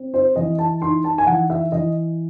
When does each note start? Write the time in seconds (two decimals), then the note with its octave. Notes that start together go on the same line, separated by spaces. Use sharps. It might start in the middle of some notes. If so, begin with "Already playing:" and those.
Already playing: C4
0.14 C5
0.35 E3 D#5
0.59 A5
0.81 D#4 C6
1.04 A5
1.18 G#5
1.27 E3 F#5
1.50 E5
1.72 E3 D#5